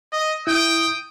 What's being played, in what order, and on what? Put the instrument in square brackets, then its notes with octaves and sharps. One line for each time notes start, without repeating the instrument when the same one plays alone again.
[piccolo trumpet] D#5
[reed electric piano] E4 [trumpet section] G5 [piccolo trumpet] D#6